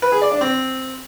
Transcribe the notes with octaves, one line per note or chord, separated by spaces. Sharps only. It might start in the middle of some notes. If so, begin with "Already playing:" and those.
B4
G#4
D5
D4
C4